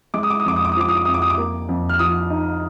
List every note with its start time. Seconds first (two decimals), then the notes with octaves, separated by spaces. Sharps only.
0.14 G#3 D6
0.23 D#6
0.30 D6
0.40 D#6
0.45 F2 D6
0.56 D#6
0.65 D6
0.72 D#6
0.77 F3 D6
0.89 D#6
0.97 D6
1.05 F2 D#6
1.14 D6
1.22 D#6
1.30 D6
1.37 A#3
1.69 F2
1.89 F6
1.99 F3 D#6
2.30 D#4